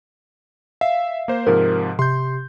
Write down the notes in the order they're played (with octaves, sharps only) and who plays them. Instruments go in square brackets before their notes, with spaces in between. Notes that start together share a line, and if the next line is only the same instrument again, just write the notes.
[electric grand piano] E5 [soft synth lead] F5
[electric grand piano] A#3 C5
[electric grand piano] G#2 C3 F3 [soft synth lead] A#4
[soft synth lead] C3 [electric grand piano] C6 G6